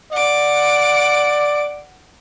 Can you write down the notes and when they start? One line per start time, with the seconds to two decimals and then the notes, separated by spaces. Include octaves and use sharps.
0.12 D5 F#5 D6